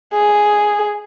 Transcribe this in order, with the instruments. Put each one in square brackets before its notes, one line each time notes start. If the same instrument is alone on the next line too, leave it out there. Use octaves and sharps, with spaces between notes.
[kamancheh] G#4